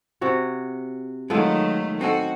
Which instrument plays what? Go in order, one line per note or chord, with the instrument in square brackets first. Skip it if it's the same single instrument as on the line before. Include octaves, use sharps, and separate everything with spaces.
[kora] C3 F#4 C#5
[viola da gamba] D#3 F#3 A3 [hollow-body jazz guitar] G#3 F4 A4 [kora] B3
[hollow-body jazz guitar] C4 D#4 A4 [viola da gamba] F#4